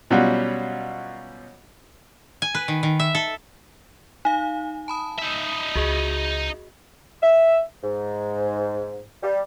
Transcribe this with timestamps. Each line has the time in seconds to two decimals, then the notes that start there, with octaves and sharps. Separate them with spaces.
0.10 B2 F#3 G3 C#4 F4 F#4
2.42 G#5
2.55 B4
2.68 D#3
2.83 D#3
3.00 E5
3.15 A4
4.25 D#4 F5 G#5
4.88 A5 B5 D#6
5.19 D#4 E5
5.75 C#2 F#4 G#4 D#5
7.22 E5
7.84 G#2
9.23 G3